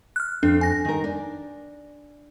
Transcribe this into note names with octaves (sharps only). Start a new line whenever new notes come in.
F6 F#6
F2 D4
G#5 A#6
D#3 A#4
D4